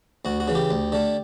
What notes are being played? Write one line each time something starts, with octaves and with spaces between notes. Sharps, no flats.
D2 F#4
F#4
C#3 E3
G4
D2
D3 A3